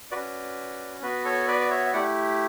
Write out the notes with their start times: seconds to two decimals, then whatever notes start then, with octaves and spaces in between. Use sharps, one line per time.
0.11 C#4 F#4 B4 D5
1.02 B3 F#4 B4
1.25 A4 C#5
1.48 B4 D5
1.61 D5
1.70 C#5 E5
1.86 E5
1.93 A3 E4 G4 D5 F#5